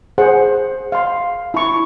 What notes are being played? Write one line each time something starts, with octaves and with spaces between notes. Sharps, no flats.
G#4 C5 F#5
F5 C6
E4 C#6